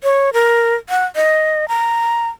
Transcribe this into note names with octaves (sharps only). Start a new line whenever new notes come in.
C#5
A#4
F#5
D#5
A#5